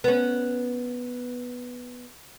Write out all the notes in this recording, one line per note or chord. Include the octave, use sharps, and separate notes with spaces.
B3 C#4